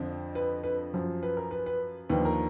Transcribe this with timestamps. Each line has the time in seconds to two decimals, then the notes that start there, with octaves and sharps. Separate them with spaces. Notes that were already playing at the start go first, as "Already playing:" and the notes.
Already playing: F2 D3 F3
0.35 B4
0.64 B4
0.94 F#2 F3
1.23 B4
1.37 A#4
1.51 B4
1.66 B4
2.09 D#2 D3 F3 B4
2.25 A#4